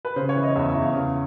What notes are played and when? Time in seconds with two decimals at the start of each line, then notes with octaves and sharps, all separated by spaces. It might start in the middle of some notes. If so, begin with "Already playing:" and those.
0.05 B4
0.16 C#3 C5
0.29 C#5
0.36 E3
0.43 D#5
0.56 E2 E5
0.69 E5
0.76 E2
0.82 F5
0.96 C#3